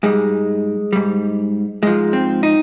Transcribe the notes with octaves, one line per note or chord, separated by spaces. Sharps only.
G#2 G3 G#3
G#2 G3
G#2 F3 G#3
C4
D#4